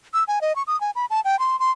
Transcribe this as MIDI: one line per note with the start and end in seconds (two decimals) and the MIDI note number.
0.13 0.24 88
0.28 0.39 80
0.41 0.55 75
0.56 0.63 85
0.67 0.79 87
0.81 0.91 80
0.95 1.06 83
1.10 1.21 81
1.25 1.39 79
1.39 1.59 84
1.59 1.71 84